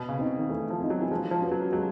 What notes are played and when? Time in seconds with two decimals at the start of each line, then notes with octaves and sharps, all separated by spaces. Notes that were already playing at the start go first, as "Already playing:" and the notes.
Already playing: B2
0.09 C#3
0.19 C4 D#4
0.39 D#3
0.49 E3 A3
0.70 F3
0.80 C4 D#4
0.90 F#3
1.02 E3
1.10 F3 G#3
1.31 F3
1.41 C#4 F#4 B4
1.52 F#3
1.72 F#3 G#3